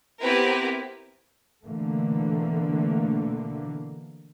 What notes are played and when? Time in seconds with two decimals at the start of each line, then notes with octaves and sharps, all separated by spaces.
0.22 B3 C4 E4 G4 A#4 B4
1.65 B2 D3 E3 A3 A#3